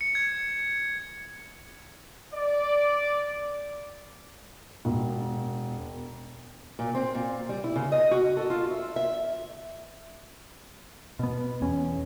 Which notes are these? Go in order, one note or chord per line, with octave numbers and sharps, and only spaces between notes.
C#7
G#6
D5
E1
A#2
C4
A#2
G3
E4
C#3
D#5
F#4
A4
F4
E5
E5
B2 B3
E2 C#4